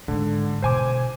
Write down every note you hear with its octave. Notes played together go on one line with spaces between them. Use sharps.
G#2 D3 D#3
E1 B2 C5 G#5 D6